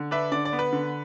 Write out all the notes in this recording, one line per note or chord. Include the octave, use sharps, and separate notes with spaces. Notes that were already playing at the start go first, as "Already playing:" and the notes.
Already playing: D3
D4 B4 E5
D3 D5
D5
B3
B4
D3